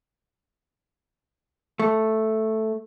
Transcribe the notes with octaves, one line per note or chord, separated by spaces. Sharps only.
A3